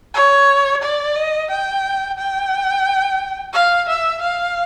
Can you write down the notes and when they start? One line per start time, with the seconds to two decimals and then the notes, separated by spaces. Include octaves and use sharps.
0.14 C#5
0.82 D5
1.16 D#5
1.50 G5
2.18 G5
3.53 F5
3.88 E5
4.22 F5